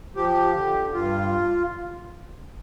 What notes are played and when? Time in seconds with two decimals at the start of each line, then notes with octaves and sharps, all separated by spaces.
0.16 F3 G4
0.54 D3
0.94 G2 F4